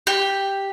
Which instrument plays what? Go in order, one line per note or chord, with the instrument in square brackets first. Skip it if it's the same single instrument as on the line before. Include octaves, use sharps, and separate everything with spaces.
[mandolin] G4